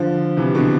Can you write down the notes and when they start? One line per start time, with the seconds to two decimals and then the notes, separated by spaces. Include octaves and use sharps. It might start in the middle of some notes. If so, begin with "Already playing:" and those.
Already playing: D3 F3
0.37 C3 E3
0.55 B2 D3